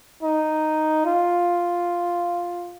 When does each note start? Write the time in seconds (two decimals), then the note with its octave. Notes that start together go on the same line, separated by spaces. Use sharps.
0.23 D#4
1.05 F4